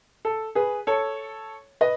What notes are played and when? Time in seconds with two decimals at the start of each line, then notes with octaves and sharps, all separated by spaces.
0.25 A4
0.55 G#4 B4
0.87 A4 C#5
1.81 B4 D#5